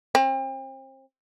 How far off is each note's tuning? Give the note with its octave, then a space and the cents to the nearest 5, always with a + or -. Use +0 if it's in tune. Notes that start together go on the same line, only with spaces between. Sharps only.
C4 +35